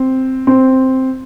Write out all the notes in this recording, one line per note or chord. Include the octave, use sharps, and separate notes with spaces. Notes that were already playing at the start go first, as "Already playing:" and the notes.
Already playing: C4
C4